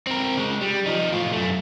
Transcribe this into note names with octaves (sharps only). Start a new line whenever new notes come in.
C4 A#4
C#3 G#3
G3
F3 D#4
A2 F4
F#2 A3